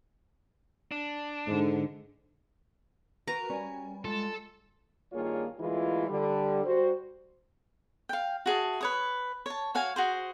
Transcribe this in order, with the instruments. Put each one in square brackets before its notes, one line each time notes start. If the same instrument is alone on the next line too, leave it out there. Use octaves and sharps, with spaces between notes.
[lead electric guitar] D4
[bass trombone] G#2 [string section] D3
[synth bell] F#4 A#4 B4 [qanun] A#5
[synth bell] G3 [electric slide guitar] C#4 G#5
[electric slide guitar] G#3 F4 [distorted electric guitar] A4
[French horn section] G2 D#3 A#3 F4 G#4 C#5
D2 A#2 E3 G#3 E4 F4
D3 G3
G3 F#4 C5
[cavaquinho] F5 G5
F#4 G#4 E5 A5
B4 C#5 D#6
C#5 A5
F#4 C#5 F5 G#5
F#4 G#4 C5